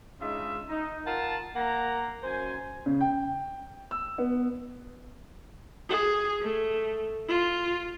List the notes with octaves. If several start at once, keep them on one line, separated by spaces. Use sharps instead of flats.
C#3 G#3 D4 D#4 F4 E5
D#4
F4 A#4 F#5 A5
A#3 F#5 A#5
F#2 C5 G#5
C#3
G5
E6
B3
G#4
A3
F4